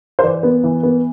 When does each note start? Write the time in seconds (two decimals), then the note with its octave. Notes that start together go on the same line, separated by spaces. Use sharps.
0.19 C5
0.23 E3 D5
0.43 B3
0.63 E3
0.83 B3